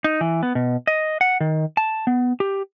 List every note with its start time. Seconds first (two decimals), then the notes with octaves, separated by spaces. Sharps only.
0.04 D#4
0.21 E3
0.43 B3
0.55 B2
0.87 D#5
1.21 F#5
1.40 D#3
1.77 A5
2.07 B3
2.40 G4